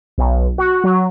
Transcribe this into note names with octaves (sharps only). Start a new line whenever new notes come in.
B1
F#4
F#3